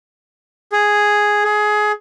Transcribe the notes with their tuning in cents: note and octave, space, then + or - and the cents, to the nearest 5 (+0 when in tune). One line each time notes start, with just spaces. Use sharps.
G#4 +0
G#4 +20